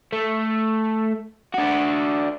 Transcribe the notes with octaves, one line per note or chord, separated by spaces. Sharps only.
A3
D4 F#4